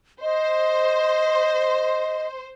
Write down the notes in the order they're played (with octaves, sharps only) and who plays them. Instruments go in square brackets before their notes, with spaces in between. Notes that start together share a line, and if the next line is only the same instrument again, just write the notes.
[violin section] C5 [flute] D#5